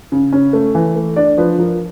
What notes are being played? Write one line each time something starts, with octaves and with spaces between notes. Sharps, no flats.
C#3
C#4
A3
E3
A3
D4 D5
F3 B4
F3 A#4